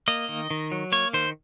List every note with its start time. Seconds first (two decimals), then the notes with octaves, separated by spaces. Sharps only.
0.08 A#3 D#5
0.29 D#3
0.51 D#3
0.72 F#3
0.92 A#3 C#5
1.13 D#3 C5